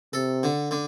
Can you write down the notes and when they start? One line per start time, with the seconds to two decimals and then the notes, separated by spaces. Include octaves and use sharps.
0.13 C3 A4
0.43 D3
0.71 D3